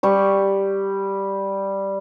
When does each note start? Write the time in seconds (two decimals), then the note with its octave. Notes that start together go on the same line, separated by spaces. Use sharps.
0.03 G3 C#6